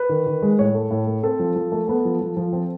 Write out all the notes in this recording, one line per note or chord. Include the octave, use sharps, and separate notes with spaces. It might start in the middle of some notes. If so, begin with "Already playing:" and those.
Already playing: B4
D#3
D#3
G#3
A2 C#5
A3
A2
A3
C4 A4
F3
F3
A3
B3 A4
F3
F3
F3
C4